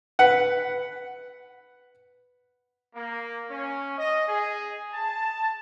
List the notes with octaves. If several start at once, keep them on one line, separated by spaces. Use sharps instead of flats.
B4 F#5
A#3
C#4
D#5
G#4
A5